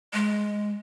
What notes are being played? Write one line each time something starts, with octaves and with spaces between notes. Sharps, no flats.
G#3